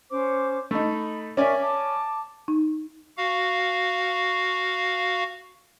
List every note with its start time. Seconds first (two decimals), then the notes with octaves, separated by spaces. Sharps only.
0.11 C#4 C5 D6
0.71 A3 D#4 B5
1.37 C#4 A#4 D5 E5 G#5 C#6
1.62 A5 D6
2.48 D#4
3.17 F#4 F5